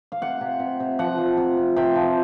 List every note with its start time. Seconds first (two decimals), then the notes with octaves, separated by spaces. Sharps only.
0.12 F5
0.21 C3 F#5
0.41 C3
0.59 C3
0.80 C3
0.99 F3 F#5
1.18 F3
1.37 C3
1.57 C3
1.76 C3 G5
1.96 F3